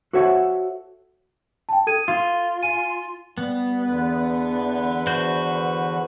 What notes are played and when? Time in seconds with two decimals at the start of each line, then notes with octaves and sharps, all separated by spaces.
0.13 F#4 A4 C5 C#5 E5 F#5
1.69 G5 A5
1.87 A4 G#6 D#7
2.08 F4
2.63 G#5 D#7
3.38 G3 B3
3.83 E2 D3 B4
5.07 F#4 C5 G6